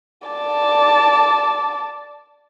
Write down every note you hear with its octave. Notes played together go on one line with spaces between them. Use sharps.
D5 A5